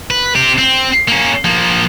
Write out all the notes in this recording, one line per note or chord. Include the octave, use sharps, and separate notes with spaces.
B4
C4 G4
C4
A#3 C#4
F3 A#3